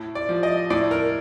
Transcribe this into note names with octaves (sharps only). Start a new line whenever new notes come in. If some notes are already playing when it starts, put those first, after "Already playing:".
Already playing: A2
D5
F3
D#5
A2 D5
A#4